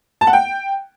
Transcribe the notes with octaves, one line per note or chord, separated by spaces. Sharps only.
A5
F#5
G5